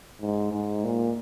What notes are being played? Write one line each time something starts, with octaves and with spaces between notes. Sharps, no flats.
G#2
G#2
A#2